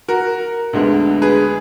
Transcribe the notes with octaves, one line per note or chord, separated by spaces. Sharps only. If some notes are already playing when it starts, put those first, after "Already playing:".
F#4 A#4
D2 D3 G#3 B3
G#4 B4